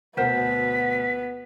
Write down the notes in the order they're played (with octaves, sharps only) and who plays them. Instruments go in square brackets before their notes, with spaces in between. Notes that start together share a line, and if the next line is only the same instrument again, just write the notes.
[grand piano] D2 B2 [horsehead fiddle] B3 [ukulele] A#4 C5 F#5 [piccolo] B6